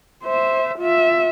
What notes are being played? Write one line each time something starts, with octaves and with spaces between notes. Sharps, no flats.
C5 E5
F4 E5